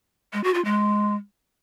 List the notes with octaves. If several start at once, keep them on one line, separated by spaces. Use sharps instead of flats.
G#3
F#4
F4
G#3